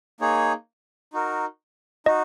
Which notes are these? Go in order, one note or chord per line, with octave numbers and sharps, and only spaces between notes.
A#3 D#4 G#4 C#5
D#4 F#4 A#4
D#4 F#4 D#5